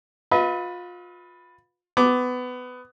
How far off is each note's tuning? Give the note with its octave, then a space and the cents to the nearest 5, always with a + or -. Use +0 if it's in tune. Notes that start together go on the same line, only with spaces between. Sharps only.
F4 +30 B4 +0 E5 -45
B3 +20 D6 +0